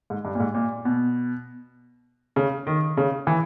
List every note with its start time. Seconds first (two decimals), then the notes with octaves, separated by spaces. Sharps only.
0.10 G#2
0.25 G2
0.35 A#2
0.40 G#2
0.55 A#2
0.85 B2
2.36 C#3
2.67 D#3
2.97 C#3
3.27 E3